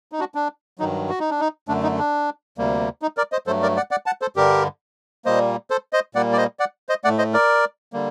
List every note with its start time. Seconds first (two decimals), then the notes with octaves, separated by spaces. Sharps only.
0.12 D#4
0.19 D4 F#4
0.35 D4
0.79 G2 D#3 F#3 D#4
1.09 F#4
1.20 D#4
1.30 D4
1.40 D#4
1.68 F#2 D3 A3 D4
1.83 D#4
1.99 D4
2.58 D2 C3 G3 A#3
3.02 D#4
3.17 A#4 D5
3.32 C5 D#5
3.47 G2 F#3 A3 A4 C5
3.63 A#4 D5
3.76 D5 F#5
3.91 D5 F#5
4.06 F#5 A5
4.22 A4 C5
4.36 G2 D3 G3 G4 A#4
5.25 A#2 G3 A#3 C5 D#5
5.70 A4 C5
5.93 C5 D#5
6.15 A#2 G3 A#3 D5 F#5
6.33 D5
6.37 C5 D#5
6.59 D5 F#5
6.89 C5 D#5
7.04 A2 A3 D5 F#5
7.18 C5 D#5
7.33 A#4 D5
7.93 D3 G3 A#3